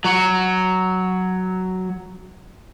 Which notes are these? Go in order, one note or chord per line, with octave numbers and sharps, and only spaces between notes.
F#3 F#4